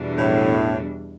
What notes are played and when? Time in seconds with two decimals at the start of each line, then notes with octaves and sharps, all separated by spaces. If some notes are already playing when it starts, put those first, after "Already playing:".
Already playing: E2 B2 G3 D4
0.18 A2